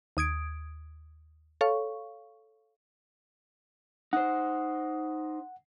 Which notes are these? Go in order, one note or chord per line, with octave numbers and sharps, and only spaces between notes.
D#2 D#6 G#6 D7
A4 C#5 F5 C#6
D#4 C5 F#5